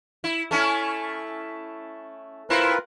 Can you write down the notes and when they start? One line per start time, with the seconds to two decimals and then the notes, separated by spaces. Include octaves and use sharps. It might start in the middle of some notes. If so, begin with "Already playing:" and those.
0.24 E4
0.51 A3 C#4 E4
2.50 C4 E4 F4 A#4 B4